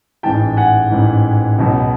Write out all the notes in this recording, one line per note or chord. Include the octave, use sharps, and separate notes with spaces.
A1 G#2 E3 G5 A5
F#5 G#5
A1 G#2 E3
C#2 B2 F#3